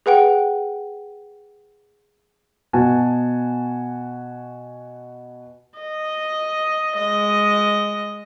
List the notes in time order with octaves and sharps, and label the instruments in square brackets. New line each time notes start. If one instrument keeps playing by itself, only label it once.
[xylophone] G#4 B4 F#5 G5
[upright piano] B2 B3 F#4 G#5 A5
[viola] D#5
G#3 D#5